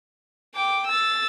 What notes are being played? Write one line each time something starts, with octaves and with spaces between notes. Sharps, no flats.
G5 D6
E6 A6